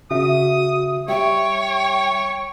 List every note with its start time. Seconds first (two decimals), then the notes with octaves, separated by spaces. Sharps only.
0.11 C#3 F#4 E5 D#6
1.08 G3 C#5 E5 G5